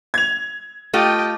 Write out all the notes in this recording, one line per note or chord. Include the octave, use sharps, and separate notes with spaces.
G#6 F7
A3 F4 G4 D#5 G5